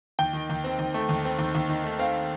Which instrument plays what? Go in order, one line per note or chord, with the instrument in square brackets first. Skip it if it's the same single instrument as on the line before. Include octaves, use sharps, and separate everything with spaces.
[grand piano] D#2 G5
D#3
D#2
C4
D#2
A3
D#2
C4
D#2
D#2
D#3
A3
C4 F5